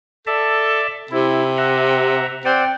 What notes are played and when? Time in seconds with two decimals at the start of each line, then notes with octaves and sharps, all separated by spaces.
0.27 A4 D5 E5 A5
1.11 C3 E4
1.57 E5 F#5 A#5
2.45 C4 D5 F#5 G5